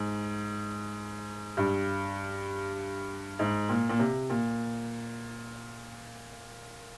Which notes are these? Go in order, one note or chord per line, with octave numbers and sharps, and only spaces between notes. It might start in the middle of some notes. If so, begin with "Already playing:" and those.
Already playing: G#2
G2
G#2
A#2
A#2
C3
A#2